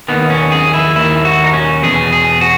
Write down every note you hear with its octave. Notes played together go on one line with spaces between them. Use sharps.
D#2 D#3 B3
C#4
G#4
E4
D#2 D#3 E4
F#4
D#4
C#4
E2 B2 G#4
G#4
F#4